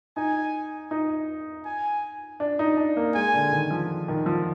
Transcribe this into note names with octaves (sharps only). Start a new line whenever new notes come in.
D#4 G#5
D#4
G#5
D4
D#4
D4
A#3
G#3 G#5
D3
D#3
F3
D#3
F3